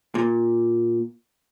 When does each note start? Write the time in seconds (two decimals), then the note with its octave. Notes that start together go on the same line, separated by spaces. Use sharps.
0.15 A#2